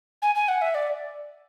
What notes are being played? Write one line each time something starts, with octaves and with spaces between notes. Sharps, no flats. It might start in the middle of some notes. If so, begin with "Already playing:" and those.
G#5
G#5
F#5
E5
D5